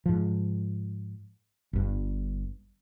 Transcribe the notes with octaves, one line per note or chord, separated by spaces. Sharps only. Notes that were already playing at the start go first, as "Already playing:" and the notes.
G#2 F3
G1 G2